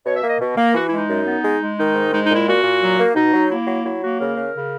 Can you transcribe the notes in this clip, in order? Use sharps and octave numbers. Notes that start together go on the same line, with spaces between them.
B2 C#5
E5
A#3
D#5
B2
A#3
E3 F#4
G#3 E4
D#4
F#2
B3
G#3
G#3
D#3 D#4
G#2
G#3 D#4
D#4
A#2
E4
A#2 F#4
A#2
F#3
A#3
B2 D#4
F#3
A#3 E4
F#3
F#3 E4
A#3 F#4
C#3 A#4
C#3
C#3